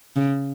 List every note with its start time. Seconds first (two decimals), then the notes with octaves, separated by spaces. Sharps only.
0.16 C#3